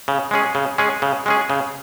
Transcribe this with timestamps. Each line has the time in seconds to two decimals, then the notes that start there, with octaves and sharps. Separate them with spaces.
0.08 C#3
0.31 G#3 C#4 G#4
0.55 C#3
0.78 G#3 C#4 G#4
1.02 C#3
1.26 G#3 C#4 G#4
1.50 C#3